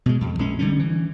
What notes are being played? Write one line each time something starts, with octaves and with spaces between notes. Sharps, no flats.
B2 G#3
F2
A#1 G#3 C#4
D3 G3 C#4
E3